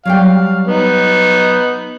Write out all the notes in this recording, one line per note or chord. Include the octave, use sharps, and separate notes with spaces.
F#3 G3 F5 G5
B3 D#4